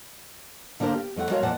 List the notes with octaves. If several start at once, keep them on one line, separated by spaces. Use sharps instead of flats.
D3 A#3 D4 A#4 C5 F5
G4
F2 A3 G4 F#5
G#3 A3 F#4 A#4 C#5 F5
F2 A#2 E3 D5 F#5 A5